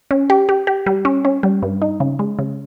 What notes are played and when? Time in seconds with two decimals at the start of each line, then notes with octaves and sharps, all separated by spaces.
0.11 C#4
0.30 G4
0.49 G4
0.67 G4
0.86 G3
1.05 C#4
1.25 C#4
1.43 G3
1.63 G2
1.82 D#4
2.00 C#3
2.19 G#3
2.39 C#3